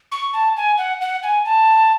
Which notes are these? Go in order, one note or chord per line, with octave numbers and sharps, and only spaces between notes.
C#6
A5
G#5
F#5
F#5
G#5
A5